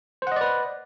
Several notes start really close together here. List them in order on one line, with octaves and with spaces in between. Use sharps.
C5 F#5 D#5 D5 B4